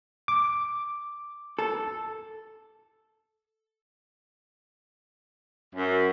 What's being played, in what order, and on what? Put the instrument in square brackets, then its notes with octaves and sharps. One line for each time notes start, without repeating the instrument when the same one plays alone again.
[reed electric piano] D6
[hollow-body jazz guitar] A4
[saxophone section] F#2